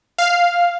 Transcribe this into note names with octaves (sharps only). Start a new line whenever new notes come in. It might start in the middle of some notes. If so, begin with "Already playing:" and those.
F5